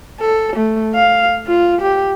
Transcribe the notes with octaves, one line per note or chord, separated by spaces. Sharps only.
A4
A3
F5
F4
G4